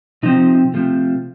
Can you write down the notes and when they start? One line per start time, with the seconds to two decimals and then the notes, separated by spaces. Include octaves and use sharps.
0.23 C3 F3 C4 D#4
0.74 C3 F3 A3